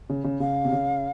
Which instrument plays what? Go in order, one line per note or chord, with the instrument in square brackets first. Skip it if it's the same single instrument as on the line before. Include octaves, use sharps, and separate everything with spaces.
[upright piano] C#3
C#3
[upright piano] C#3 [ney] F5
[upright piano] C3
C#3